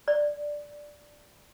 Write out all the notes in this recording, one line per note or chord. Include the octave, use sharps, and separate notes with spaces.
D5